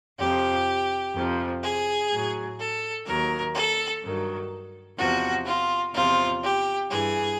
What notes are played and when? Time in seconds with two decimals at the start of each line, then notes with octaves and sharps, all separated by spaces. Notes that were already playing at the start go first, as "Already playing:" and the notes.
0.19 F2 C3 F3 G4
1.14 F2 C3 F3
1.63 G#4
2.11 A2 F#3
2.59 A4
3.06 D#2 D#3 F#3 A#4
3.54 A4
4.02 G2 D#3 F#3
4.98 E2 C3 F3 F#4
5.45 F4
5.93 E2 C3 F3 F4
6.42 G4
6.89 G2 E3 G#4